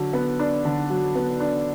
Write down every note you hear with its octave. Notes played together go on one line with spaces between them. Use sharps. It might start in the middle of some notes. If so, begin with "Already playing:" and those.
Already playing: D3 F#3
B3
D4
D3
F#3
B3
D4